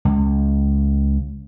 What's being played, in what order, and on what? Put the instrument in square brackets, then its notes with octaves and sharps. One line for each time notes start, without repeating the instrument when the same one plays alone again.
[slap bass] C#2